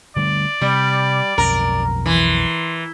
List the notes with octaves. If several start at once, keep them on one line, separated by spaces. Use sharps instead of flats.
D3 G3 A3 D5
C3 G3
B1 F2 A#4
E3 C6